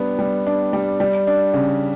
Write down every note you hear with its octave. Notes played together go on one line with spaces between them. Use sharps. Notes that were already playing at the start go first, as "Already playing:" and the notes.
Already playing: G3 B3 D4
G3
D4
G3
G3
D4
C#3